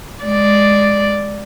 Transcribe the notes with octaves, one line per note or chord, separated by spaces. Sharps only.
G#3 D5